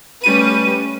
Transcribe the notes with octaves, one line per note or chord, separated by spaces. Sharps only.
G3 A3 C#4 B4 D#7